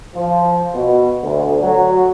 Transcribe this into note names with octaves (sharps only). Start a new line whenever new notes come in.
F3
B2
D2
F#3